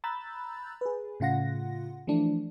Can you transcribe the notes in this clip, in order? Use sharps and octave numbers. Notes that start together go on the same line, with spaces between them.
A#5 B5 E6 F#6 G6 A6
G#4 B4
A2 C#3 F4 F#5 A#6
E3 F3 A3 D4